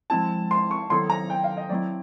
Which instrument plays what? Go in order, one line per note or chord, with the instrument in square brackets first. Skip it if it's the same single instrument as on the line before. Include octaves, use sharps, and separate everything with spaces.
[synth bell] F3 G#3 C4 E4 [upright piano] A5
[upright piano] C6
C#6
[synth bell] D#3 F#3 B3 E4 A4 [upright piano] C6
[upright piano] A#5
G5
F5
D#5
[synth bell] F#3 A3 C4 E4 [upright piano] D5